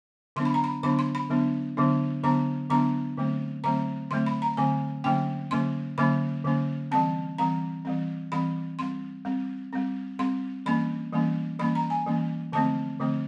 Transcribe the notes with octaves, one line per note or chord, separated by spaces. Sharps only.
D3 F#3 B3 D4 C6
B5
A#5
B5
D3 F#3 B3 D4 B5
C6
B5
D3 F#3 B3 D4
D3 F#3 B3 D4
D3 F#3 B3 D4 A#5
D3 F#3 B3 D4 A#5
D3 F#3 A3 C4
D3 F#3 A3 C4 A#5
D3 F#3 A3 C4 C6
B5
A#5
D3 F#3 A3 C4 G#5
D3 F#3 A#3 C#4 G5
D3 F#3 A#3 C#4 C6
D3 F#3 A#3 C#4 B5
D3 F#3 A#3 C#4
E3 G3 C4 A5
E3 G3 C4 A#5
E3 G3 C4
E3 G3 C4 B5
G3 C4 C6
G3 C4
G3 C4
G3 C4 C6
E3 G3 A#3 C#4 B5
E3 G3 A#3 C#4
E3 G3 A#3 C#4 B5
A#5
G#5
E3 G3 A#3 C#4
D3 F3 A3 C4 A5
D3 F3 A3 C4